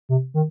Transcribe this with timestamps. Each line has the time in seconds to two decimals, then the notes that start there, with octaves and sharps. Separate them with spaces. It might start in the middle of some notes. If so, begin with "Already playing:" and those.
0.09 C3
0.34 D#3